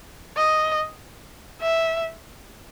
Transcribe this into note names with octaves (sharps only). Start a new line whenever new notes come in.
D#5
E5